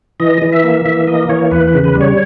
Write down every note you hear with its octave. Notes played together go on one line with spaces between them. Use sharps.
E3 D#5
E3
E5
A#3
E3 E5
A#3 D#5
E3 C#5
E2 B4
B4
C#3
B4
G3
C#5